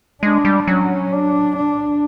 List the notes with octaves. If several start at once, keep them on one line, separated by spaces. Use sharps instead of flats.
G#3 D4
G3
F#3 C#4
D4
D4